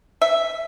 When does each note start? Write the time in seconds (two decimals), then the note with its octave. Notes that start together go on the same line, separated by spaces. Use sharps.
0.22 E5